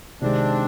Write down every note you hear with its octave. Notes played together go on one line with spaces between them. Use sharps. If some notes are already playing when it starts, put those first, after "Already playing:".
C3 D#3 G#3 C4 D4